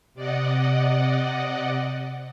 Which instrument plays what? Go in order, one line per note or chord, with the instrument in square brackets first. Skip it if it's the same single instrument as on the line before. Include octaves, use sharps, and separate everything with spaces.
[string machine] C3 D5 D#5 F#5